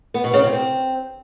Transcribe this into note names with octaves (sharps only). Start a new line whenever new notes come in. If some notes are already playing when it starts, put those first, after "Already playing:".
B3
B2
C#3
C3
C4